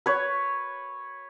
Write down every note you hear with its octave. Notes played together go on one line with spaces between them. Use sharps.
B4 C#5